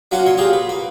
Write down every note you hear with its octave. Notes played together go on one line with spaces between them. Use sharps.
F#3 A#3 C#4 F4 F#4 F#5
A#2 C#5 C6
F4 G4 G#4 A#4
B4
A#3